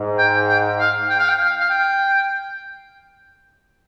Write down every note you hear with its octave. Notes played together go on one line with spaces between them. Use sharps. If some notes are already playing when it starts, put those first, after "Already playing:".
Already playing: G#2
G5
G5
F5
G5
F5
G5
F5
F5
G5